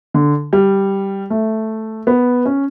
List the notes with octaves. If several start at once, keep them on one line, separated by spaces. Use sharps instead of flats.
D3
G3
A3
B3
C#4